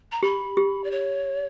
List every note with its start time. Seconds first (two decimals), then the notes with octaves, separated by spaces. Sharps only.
0.12 A#5
0.23 G4 B5
0.57 G4
0.84 D5
0.91 C#5